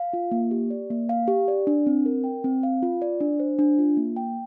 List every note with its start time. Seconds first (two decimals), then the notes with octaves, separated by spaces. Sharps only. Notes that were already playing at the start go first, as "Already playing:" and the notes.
Already playing: F5
0.13 F4
0.31 A#3
0.51 G4
0.71 D5
0.90 A#3
1.09 F5
1.28 G4
1.48 D5
1.67 D4
1.86 C4
2.06 A#4
2.24 G5
2.44 C4
2.63 F5
2.83 F4
3.02 D5
3.20 D4
3.40 C5
3.59 D4
3.79 F4
3.97 A#3
4.16 G5